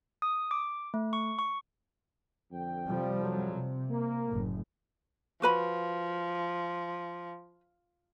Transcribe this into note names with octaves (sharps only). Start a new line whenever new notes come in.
D#6
D6
A3
C#6
C#6
F2 D3 G5
C3 F3 G3
F2 G#2 F#3
C3
A#3
F#1 A2
F3 F#4 B4 B5